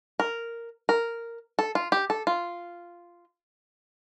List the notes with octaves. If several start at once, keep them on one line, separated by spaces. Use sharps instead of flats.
A#4
A#4
A4
F4
G4
A4
F4